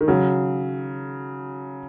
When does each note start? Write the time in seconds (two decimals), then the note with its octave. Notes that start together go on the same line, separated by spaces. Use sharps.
0.01 D#3
0.08 C#3 F#3